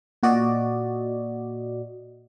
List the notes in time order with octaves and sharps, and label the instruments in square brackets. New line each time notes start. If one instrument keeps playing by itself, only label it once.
[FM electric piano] A#2 F#4 D5 D#5